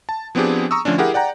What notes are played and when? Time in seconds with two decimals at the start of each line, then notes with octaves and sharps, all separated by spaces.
0.09 A5
0.35 F3 B3 C4 D4 G4 G#4
0.71 A#5 C#6 D#6 E6
0.85 D3 F3 A3 C#4 D4
0.98 E4 G4 G#4 A#4 F#5
1.14 D5 F#5 G5 A#5